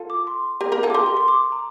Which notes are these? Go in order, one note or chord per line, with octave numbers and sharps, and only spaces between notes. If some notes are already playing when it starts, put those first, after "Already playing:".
Already playing: F4 A4
D6
C6
G4 A#4
G4 A#4
F4 A4
D6
G4 A#4 C6
C6
C6
D6
A#5